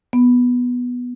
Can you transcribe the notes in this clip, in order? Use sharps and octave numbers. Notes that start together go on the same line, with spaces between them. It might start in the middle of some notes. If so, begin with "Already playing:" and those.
B3